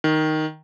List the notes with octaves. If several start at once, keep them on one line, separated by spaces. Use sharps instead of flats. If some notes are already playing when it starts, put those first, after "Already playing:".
D#3